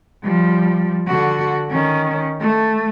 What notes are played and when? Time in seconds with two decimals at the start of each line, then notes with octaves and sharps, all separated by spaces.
0.23 F3 G3
1.07 D3 F#4
1.70 D#3 C#4
2.40 A3